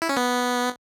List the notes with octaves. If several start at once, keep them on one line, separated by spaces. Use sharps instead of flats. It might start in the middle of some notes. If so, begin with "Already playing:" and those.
E4
C#4
B3